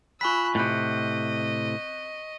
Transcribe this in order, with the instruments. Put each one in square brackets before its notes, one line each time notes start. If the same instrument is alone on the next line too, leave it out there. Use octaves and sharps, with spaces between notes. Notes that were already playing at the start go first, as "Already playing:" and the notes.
[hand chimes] F4 G#5 B5 [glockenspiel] C#6 B6 [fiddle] E6 F#6
[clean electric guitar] A2 C3 [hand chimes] C4 F#6 G6 [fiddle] D#5